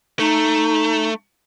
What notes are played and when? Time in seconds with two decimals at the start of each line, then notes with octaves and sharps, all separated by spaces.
0.19 A3 D#4